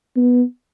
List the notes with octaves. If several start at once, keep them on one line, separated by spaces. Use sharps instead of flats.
B3